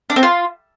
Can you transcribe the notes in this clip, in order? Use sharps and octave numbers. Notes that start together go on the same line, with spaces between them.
D4
C4
F4